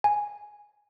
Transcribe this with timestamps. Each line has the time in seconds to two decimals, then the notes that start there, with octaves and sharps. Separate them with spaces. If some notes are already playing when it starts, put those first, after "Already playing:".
0.04 G#5